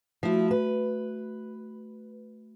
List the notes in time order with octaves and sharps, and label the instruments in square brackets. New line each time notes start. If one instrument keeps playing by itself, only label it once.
[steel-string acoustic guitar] F3 E4 [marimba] A3 F#4
[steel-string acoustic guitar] B4